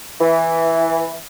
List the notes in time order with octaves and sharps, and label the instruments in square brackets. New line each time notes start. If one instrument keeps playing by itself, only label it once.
[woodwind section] E3